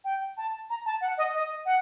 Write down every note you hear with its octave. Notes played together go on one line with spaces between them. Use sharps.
G5
A5
A#5
A5
F#5
D#5
D#5
F#5